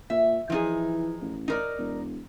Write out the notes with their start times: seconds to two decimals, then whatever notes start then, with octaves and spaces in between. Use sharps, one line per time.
0.10 A#2 E5
0.50 E3 F3 D#4 G#4
1.22 A1
1.48 D#4 A#4 D5
1.78 E1